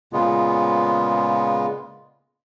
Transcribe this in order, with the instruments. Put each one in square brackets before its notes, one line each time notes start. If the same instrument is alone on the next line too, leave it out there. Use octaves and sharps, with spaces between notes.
[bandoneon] A#2 C#3 G#3 B3 F4